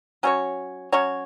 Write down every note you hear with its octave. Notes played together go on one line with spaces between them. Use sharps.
F#3 C#4 F#4 C#5
F#3 C#4 F#4 C#5